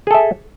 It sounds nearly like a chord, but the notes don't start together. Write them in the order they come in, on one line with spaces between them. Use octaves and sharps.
G#4 A4 E5